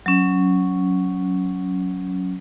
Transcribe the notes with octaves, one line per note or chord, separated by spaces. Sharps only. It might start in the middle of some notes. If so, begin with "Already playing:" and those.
F#3 C#4